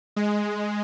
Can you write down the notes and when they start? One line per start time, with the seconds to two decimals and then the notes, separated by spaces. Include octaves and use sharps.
0.16 G#3